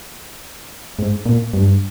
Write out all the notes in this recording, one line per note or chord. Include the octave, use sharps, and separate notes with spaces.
G#2
A#2
G2